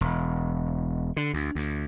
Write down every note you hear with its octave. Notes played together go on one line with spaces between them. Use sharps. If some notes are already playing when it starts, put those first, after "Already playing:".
E1
D3
D2
D2